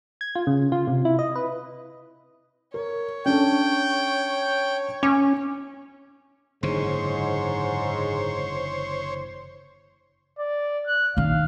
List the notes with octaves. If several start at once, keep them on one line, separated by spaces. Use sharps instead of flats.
G#6
F4
C#3
F4
C3
E4
D#5
B4
A#4 C#5
C#4 D4 A4 G5
C#4 D6
F#1 G#2 D3 E3 C5 C#5
D5
F#6
A#1 D#3 F5